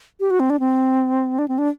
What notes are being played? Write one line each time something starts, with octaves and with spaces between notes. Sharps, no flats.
G4
F#4
C4
D4
C4
D4
C4
D4